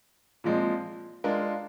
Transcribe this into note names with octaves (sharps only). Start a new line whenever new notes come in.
A#2 F3 G#3 C4
G#3 D4 F4 A#4